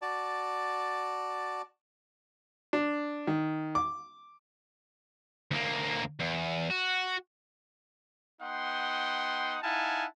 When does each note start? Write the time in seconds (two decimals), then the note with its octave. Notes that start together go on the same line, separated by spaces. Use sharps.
0.02 F#4 D5 A5
2.73 D4
3.27 D#3
3.75 D6
5.51 D2 A#3
6.20 E2
6.71 F#4
8.41 B3 D#4 F#5 G5 C6 D#6
9.62 D#4 E4 F5 F#5 G#5 A5